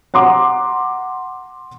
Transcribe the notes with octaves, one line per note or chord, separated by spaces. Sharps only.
F#5 A#5 C6 D6